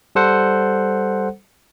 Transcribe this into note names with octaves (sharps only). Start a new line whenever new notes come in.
G3 A4 C5 F#5